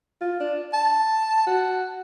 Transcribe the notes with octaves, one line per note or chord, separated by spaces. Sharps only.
F4
D4
A5
F#4